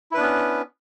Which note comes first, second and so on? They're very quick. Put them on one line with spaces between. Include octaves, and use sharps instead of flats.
E4 B4 D4 B3 C#4